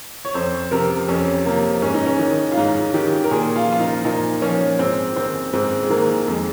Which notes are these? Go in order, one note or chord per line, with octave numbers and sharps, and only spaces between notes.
C#5
F2 C5
C3 F3 A#4
F2 C#4
C3 F3 A#3
G#2 C#4
D#4
C#4
D#3
F4
G#2 D#4
D#3 G4
A#4
A#2 G#4
F4
F3 F4
D#4
A#2 D#4
F3 C#4
G#2 C4
D#3 C4
G#2 C4
G#3
D#3 A#3
F2 G#3